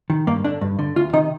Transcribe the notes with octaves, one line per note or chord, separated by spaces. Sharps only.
D#3
G2 A#3
D3 D4
G2
D3
D2 F4
C3 D#3 D#4